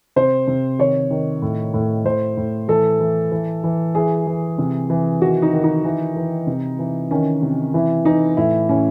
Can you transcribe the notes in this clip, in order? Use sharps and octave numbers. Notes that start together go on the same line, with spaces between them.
C3 C5
C3
D#3 C#5
D#3
A2
A2
A2 C5
A2
E3 A4
E3
E3
E3
E3 G#4
E3
C3
E3
D#3 F#4
D#4
D#3
D#4
E3
E3
C3
E3
D#3 C#4
C3
E3 E4
E3 D#4
A2 E4
A2 C#4